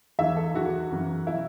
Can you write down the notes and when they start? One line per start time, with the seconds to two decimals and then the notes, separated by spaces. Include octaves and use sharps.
0.19 E2 E3 E5
0.36 A4
0.54 E2 E3 F#4
0.92 F#2 E3
1.27 B2 F#3 E4